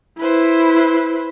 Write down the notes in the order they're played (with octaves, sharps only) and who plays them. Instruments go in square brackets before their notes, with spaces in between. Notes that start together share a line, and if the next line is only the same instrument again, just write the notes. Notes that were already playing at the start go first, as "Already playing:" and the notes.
[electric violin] E4 [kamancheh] B4 C5